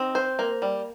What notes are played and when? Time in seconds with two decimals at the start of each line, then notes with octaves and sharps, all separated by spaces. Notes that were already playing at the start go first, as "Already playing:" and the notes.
Already playing: C4 D#4
0.15 C5
0.39 A#3
0.62 G3